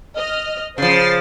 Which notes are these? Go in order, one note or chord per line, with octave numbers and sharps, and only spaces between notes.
D#5 F6
C#3 F3 C5 A6 C7